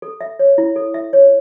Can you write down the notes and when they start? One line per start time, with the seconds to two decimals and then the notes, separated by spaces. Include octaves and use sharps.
0.02 A4
0.21 E5
0.39 C#5
0.58 E4
0.76 A4
0.94 E5
1.13 C#5